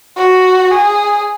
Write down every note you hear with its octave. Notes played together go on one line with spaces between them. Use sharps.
F#4
G#4